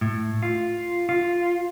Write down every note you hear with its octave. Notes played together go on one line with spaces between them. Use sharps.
A2
F4
F4